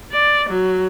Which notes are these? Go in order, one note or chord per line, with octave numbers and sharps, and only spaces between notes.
D5
F#3